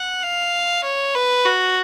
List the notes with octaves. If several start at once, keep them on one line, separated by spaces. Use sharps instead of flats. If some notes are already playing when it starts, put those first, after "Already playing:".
Already playing: F#5
F5
C#5
B4
F#4